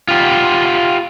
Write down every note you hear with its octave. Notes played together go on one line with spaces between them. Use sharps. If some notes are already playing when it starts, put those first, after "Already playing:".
F4 G4